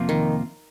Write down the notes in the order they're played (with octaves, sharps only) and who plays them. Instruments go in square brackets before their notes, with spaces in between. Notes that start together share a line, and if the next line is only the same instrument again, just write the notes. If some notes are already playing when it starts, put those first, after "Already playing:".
Already playing: [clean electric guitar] F2 C3 F3 A#3 F4
[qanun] D#3